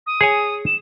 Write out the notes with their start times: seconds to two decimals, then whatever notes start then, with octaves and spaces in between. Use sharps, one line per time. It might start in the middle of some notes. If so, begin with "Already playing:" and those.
0.07 D#6
0.21 G#4 C#5 G#5
0.66 E7